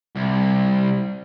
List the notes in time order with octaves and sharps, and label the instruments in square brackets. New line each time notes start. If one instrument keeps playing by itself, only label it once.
[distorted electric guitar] C2